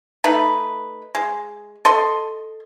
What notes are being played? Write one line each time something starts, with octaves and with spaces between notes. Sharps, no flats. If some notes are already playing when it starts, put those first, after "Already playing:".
A3 D#4 B4
G#3
A4 D#5 C6